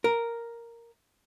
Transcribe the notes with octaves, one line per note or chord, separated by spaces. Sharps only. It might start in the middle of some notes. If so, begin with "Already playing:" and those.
A#4